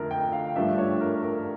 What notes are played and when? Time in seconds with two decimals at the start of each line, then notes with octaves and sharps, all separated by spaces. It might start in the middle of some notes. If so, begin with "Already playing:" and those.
Already playing: F2 D3 A3 A#4
0.11 G5
0.33 F5
0.56 G2 F3 A3 D4 E5
0.78 C#5
1.00 A#4
1.23 A#4